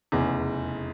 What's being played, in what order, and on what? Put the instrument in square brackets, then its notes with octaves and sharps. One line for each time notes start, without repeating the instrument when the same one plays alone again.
[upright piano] F1 E2 C#3